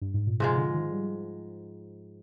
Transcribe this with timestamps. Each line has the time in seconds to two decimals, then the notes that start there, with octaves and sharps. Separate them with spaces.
0.02 G2
0.14 G#2
0.27 A#2
0.40 G#2 C3 F3 G#3
0.51 C3
0.57 D3
0.74 D#3
0.92 G3